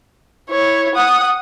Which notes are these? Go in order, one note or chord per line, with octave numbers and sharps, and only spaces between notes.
E4 C#5
F#5 D#6